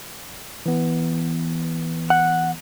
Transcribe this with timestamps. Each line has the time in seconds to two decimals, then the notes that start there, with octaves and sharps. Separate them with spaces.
0.66 E3 B3
2.10 F#5